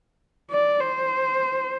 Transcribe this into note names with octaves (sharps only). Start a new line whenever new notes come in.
D5
C5